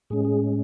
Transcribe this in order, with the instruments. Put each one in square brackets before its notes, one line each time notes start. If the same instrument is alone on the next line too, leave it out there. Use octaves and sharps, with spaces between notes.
[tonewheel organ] A2 G#3 C#4 G#4
G#4